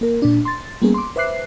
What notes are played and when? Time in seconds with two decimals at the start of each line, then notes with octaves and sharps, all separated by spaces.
0.01 A#3 A#4
0.22 A#2 D4
0.45 C6 A6
0.82 G3 A#3 B3 C#4 G#4
0.94 C6 D6
1.16 B4 C5 E5 D6 F#6 C7